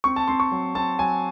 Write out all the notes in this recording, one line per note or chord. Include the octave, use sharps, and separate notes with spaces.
C4 C#6
A5
C4 C6
C#6
F#3
C4 A5
F#3 G#5